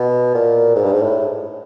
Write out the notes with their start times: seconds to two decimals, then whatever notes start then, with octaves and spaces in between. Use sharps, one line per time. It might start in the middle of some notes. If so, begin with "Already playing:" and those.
Already playing: B2
0.34 A#2
0.76 G#2
0.84 G2
0.92 G#2
1.03 A2